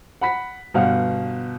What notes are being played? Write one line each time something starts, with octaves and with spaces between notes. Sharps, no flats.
F#5 B5 B6
G1 B2 F5 F#5